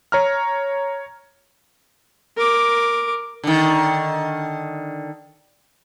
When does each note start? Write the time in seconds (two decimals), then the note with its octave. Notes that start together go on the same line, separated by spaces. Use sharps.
0.12 C#5 A#5 F6
2.37 A#4 D6
3.44 D3 D#3